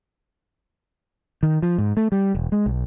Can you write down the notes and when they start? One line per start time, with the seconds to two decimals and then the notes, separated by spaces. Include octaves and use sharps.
1.43 D#3
1.62 F3
1.78 G#2
1.97 A3
2.12 G3
2.35 E1
2.52 G#3
2.66 B1